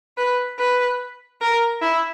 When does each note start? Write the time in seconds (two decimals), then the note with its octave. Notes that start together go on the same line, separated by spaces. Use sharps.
0.18 B4
0.59 B4
1.41 A#4
1.82 E4